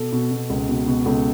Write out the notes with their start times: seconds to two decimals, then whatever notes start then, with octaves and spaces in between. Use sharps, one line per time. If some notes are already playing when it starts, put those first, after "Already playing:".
Already playing: B2 A4
0.12 B2
0.31 B2
0.50 C#2
0.69 B2
0.88 B2
1.06 C#2 A4